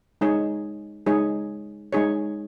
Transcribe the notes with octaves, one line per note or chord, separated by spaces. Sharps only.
G#3 D#4 G#4 C#5
G#3 D#4 G#4 C#5
G#3 D#4 G#4 C#5